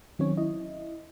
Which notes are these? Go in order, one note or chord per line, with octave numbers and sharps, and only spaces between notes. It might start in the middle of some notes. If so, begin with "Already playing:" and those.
D#3 F#3 C4 C#4 C#5
E4 D#5